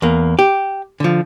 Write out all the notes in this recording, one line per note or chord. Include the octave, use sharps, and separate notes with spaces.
E2 A#3
G4
D3 F3